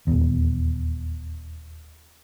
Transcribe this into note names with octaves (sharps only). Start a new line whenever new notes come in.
D#1 E2